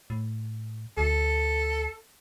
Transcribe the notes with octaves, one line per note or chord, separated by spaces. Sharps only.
A2
D2 A4